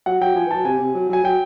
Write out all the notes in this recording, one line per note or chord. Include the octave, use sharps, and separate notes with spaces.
F#3 F#5
F#3 G5
F3 G#5
E3
F#3 A5
C3 G#5
C3
F#3
F#3 G#5
F#3 G5